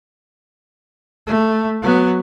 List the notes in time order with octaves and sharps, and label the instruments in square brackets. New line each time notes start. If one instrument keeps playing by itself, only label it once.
[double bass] A3
F#3 B3